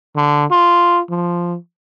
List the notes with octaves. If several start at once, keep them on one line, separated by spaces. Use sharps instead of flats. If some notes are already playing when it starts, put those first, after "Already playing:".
D3
F4
F3